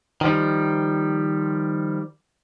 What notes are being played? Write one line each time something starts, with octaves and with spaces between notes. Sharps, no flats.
D#3 F3 G3